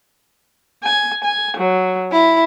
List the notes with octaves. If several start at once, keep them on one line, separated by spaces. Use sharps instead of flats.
G#5
G#5
F#3
E4